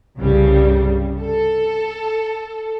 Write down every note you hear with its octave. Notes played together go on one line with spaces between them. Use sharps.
C2 G2 C#3 G3
A4